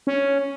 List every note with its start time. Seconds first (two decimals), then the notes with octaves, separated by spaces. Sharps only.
0.07 C#4